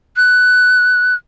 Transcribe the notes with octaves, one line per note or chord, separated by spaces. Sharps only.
F#6